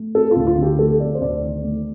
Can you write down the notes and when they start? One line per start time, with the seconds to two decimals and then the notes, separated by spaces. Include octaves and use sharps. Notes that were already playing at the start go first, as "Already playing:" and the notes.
Already playing: A3
0.15 C4 A4
0.31 F4
0.36 D2
0.47 F4
0.58 D3 G4
0.79 A3 A4
1.00 C4 D5
1.15 C5
1.21 D2 D5
1.43 D#3
1.64 A3